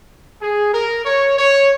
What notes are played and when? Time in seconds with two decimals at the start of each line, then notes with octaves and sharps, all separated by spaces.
0.42 G#4
0.73 A#4
1.06 C#5
1.37 C#5